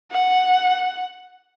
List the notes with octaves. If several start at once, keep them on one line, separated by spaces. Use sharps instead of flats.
F#5